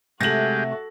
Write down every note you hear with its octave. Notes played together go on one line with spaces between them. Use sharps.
C3 G#3 A3 F#4 G4 A4 A#6 F#7